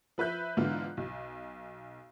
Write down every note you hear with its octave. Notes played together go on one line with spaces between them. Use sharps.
F3 B4 E5 F#6 G6
G#2 D3 E3 B3 F4
B1